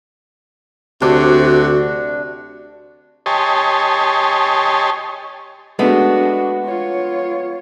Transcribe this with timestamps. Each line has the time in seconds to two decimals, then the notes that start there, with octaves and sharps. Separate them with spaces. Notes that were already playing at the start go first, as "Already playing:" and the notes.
1.02 D2 C3 D4 F#4
3.26 G4 C#5 D#5 G#5 A5 C6
5.79 G#3 A3 B3 D4 F#4
6.65 F4 C#5